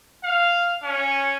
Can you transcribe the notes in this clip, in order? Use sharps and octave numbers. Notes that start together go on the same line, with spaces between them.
F5
C#4